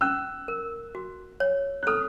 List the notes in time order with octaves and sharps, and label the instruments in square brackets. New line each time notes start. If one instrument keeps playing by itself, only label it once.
[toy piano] C#4 [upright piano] E6 F#6
[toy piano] A#4
F#4
C#5
[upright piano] F#6
[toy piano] A4 [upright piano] D#6 F6